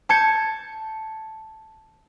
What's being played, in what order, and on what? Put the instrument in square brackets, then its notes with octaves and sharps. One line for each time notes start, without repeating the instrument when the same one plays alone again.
[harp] A5 G6 G#6 C#7